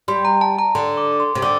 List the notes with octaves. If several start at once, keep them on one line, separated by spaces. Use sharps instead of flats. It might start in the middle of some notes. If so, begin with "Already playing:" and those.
G3 C6
A#5
A5
A#5
D3 C6
D6
D6
C6
C3
D3 D6